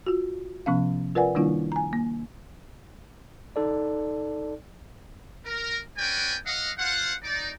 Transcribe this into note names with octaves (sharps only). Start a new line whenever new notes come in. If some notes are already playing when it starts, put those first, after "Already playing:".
F4 F#4
C3 F3 B3 C#4 F5
F4 A#4 B4 D5 F#5 G#5
D#3 G3 A#3 D4 E4 F4
G#5 A#5
A#3
D#4 A4 D5
A#4
C#4 F#4 B4 D5 G5 G#5
D#5 F5 F#5
F4 C5 F5 F#5
D#4 D5